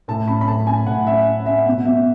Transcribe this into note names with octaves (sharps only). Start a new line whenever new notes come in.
A2 A5
C#4 B5
B5
A2 A5
C#4 G#5
A2 F#5
C#4 E5
C#4
C#4 E5
B2 F#5
B2 E5